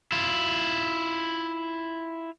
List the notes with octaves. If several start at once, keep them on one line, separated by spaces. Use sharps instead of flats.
E4 F4